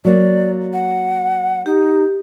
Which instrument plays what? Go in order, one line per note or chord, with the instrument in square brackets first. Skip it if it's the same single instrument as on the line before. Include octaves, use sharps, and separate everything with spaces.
[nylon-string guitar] F#3 A#3 [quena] D5
[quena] F#5
[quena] D#4 [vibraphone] G4